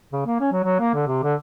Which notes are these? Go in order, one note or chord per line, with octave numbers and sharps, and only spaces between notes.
C#3
A#3
C#4
F#3
F#3
A#3
D3
C3
D3